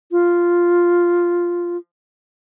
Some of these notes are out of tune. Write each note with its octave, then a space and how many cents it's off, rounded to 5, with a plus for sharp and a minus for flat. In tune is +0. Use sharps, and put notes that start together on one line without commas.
F4 +0